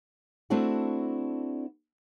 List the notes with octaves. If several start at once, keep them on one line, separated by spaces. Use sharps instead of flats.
A3 C4 D4 E4 F#4